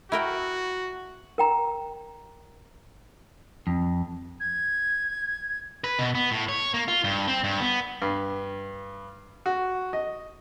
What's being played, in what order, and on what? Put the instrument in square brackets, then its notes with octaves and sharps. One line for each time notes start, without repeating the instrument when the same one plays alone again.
[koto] E4 A#4 G5 [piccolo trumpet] F#4
[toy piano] A#4 G5 A#5
[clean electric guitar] F2
[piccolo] G#6
[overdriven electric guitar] B4
B2
B3
A2
C#5
A#3
F4
G2
C4
G2
B3
[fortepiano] G2
F#4
D#5